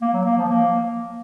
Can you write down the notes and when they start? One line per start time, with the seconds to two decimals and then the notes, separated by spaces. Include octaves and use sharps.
0.02 A#3
0.13 F#3
0.25 A#3
0.37 F3
0.49 A#3